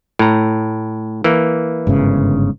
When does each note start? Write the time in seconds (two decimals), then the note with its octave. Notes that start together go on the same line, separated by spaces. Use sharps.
0.19 A2 A#5
1.24 E3 A#3
1.87 G1 G#2 C#3